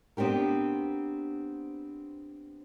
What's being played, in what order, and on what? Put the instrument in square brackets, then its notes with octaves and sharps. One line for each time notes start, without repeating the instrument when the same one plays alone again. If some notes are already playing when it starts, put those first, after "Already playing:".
[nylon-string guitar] B3 C4 D4 G4 A#4